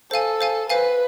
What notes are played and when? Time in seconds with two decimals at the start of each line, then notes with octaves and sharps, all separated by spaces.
0.11 A4 C5 F5 G#5
0.41 C5 F5 G#5
0.70 B4 C5 F5 G#5